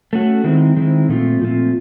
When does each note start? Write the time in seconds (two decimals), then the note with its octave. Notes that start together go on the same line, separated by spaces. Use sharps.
0.13 A3 C#4 F#4
0.44 D#3 G#3 C4 E4
0.77 D#3 G#3 C4 E4
1.09 A#2 F3 A3 C4 F4
1.41 A#2 F3 A3 C4 F4